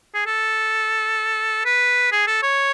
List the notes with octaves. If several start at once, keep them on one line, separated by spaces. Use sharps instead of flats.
G#4
A4
B4
G#4
A4
C#5